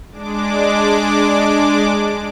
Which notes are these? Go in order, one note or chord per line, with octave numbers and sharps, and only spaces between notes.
G#3 D4 D6